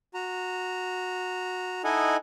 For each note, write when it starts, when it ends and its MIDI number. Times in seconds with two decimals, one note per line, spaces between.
0.14 1.82 66
0.14 1.82 82
1.84 2.17 63
1.84 2.17 64
1.84 2.17 69
1.84 2.17 75
1.84 2.17 78
1.84 2.17 80